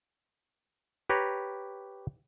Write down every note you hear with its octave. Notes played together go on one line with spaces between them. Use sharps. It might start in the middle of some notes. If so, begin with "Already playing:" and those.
G4 B4 C#5 A#5